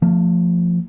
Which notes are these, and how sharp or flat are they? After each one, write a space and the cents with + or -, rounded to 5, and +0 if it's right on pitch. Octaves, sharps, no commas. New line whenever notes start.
F3 +0 A3 +35